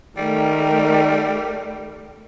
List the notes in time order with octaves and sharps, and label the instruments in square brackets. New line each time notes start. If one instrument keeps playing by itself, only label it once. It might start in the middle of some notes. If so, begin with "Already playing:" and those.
[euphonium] D#3 [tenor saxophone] G3 [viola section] A3 A#4